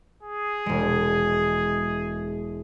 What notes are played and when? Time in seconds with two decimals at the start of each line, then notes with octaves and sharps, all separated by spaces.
0.23 G#4
0.66 E1 G#3